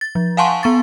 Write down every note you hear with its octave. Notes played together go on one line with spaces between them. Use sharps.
A6
F3
F5 F#5 G#5 A5 C6 C#6
B3 C#6 A6